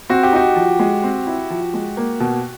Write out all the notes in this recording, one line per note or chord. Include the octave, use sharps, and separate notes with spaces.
C4 F#4
G4
D#4 F#4
F3
G#3
C4
E4
F3
G#3
A#3
B2